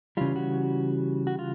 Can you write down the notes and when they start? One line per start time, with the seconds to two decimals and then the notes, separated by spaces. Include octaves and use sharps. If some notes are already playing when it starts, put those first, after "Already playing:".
0.17 C#3 E3 G3 F4
0.36 F#4
1.27 F#4
1.39 F4